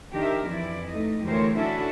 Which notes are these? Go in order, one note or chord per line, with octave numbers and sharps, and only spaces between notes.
D#3 D4 G4 A#4 E5
F2 E3 E4 D5
A3 D#4 D#5
D2 E3 G4 A#4 C5 C#5
C#4 D4 E4 F#4 A4 E5